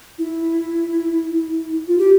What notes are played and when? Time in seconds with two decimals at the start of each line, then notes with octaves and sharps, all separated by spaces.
0.19 E4
1.88 F4
1.98 G4